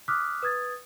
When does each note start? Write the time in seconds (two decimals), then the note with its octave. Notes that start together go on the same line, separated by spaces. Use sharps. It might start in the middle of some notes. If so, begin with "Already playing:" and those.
0.08 D6 D#6 F6 F#6 B6
0.43 B4 D#6 G#6 A6